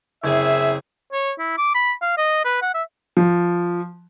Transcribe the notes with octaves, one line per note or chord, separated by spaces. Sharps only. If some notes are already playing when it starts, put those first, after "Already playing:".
F#1 C4 E4 G#4 E5
C#5
E4
D6
B5
F5
D#5
B4
F#5
E5
F3